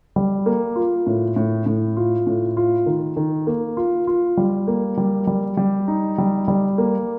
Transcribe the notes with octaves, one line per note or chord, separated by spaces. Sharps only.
G3
A#3
F4
A2
A2
A2
F4
A2
F4
D#3
D#3
A#3
F4
F4
G3
A#3
G3
G3
G3
D#4
G3
G3
A#3